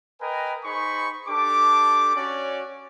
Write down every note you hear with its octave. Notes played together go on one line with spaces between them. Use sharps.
A#4 B4 D#5 G5 G#5 A#5
D#4 G#4 C5 B5 C#6
D4 G4 A4 D6
C#4 F#4 C#5 D5